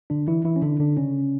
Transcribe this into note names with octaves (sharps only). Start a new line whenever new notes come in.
D3 D4
E3 E4
E3 E4
C#4
D3 D4
D3 D4
C#3 C#4